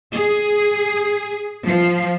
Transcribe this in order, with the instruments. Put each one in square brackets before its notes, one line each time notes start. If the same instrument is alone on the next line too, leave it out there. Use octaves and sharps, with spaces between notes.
[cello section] G#4
F3